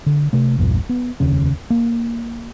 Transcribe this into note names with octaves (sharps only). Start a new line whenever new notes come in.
D3
C3 A3
A#1 E2 G2 A#2
B3
F1 D#2 C#3 C#4
A#3